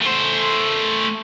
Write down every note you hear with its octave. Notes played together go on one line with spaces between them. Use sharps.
A3 C5